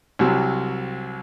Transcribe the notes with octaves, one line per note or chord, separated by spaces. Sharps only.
C2 C3 F#3